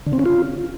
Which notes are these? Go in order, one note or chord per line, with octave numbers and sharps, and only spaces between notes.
D3
C4
C#4
F4